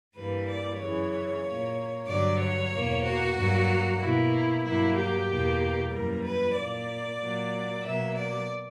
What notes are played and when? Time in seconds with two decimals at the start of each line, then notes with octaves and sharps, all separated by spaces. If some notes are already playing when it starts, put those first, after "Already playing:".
0.15 G2 E3 G3 A#3 B4
0.48 D5
0.79 F#2 C#3 E3 C#5
1.44 A#2 A#3
2.07 G2 D3 F#3 D5
2.40 C#5
2.71 E2 B2 A#3
3.04 F#4
3.35 G2 F#3 A#3
3.99 B2 A#3 E4
4.63 G2 F#3 A#3 E4
4.95 G4
5.27 E2 B2 A#3
5.91 F#2 E3 G3 A#3 A#4
6.23 B4
6.55 A#2 A#3 D5
7.19 A#2 F#3 A#3
7.83 B2 F#3 A#3 E5
8.15 D5